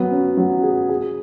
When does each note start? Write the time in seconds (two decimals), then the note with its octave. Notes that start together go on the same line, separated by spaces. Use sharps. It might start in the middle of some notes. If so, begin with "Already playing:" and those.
Already playing: F#3 B3
0.11 C#4
0.37 F#3
0.63 G#4
0.89 G#4